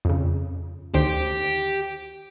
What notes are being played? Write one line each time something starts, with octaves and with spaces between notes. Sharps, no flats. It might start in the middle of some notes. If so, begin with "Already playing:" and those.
F2 C#3
D2 D#3 G4 C5